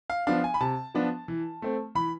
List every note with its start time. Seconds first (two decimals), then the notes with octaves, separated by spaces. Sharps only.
0.10 F5
0.27 F3 B3 D4 F5
0.44 G#5
0.54 B5
0.60 C3 A5
0.95 F3 B3 D4
1.28 E3
1.62 A3 C4
1.95 E3 B5